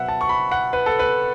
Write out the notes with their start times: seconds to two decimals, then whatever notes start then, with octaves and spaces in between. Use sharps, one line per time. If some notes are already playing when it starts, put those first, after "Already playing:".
Already playing: B2 F#3 B4 E5 F#5
0.08 A5
0.21 C#6
0.29 B5
0.52 F#5
0.73 B4
0.86 A4
0.99 B4